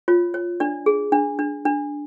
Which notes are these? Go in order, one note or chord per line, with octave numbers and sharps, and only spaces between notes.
F4 C#5
C#5
D4 D5
G#4
D4
D4
D4